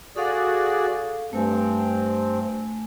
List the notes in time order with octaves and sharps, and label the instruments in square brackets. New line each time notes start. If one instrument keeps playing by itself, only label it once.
[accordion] F#4 G#4 D5 [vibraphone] A4 F5
[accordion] G2 C4 [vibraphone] A3 G#5